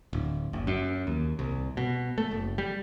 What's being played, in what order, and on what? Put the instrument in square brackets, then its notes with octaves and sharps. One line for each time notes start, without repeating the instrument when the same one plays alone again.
[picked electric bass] D1
F#1
F#2
D#2
C2
B2
A3
F#1
G3